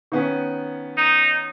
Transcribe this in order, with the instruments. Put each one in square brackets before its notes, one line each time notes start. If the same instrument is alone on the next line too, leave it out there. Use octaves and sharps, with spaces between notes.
[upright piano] D#3 B3 C#4
[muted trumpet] D#4